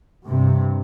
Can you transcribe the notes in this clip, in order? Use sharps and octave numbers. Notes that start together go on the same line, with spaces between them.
G2 C3